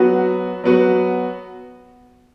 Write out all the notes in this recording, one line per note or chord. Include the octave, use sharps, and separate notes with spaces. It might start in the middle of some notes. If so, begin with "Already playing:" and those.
Already playing: F#3 B3 F#4
F#3 B3 F#4